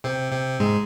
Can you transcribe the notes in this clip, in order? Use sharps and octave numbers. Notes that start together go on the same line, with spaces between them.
C3 C4
C3 C4
G#2 G#3